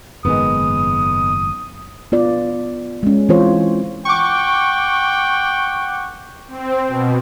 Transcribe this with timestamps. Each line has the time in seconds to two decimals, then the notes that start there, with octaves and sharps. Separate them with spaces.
0.25 F#1 G#2 D#3 G#3 B3 D#6
2.12 B3 F4 D5
3.03 G#3 C#4
3.29 E3 C4 F4 C5 C#5
4.05 F#5 G5 C#6 D6
6.48 C4
6.88 B2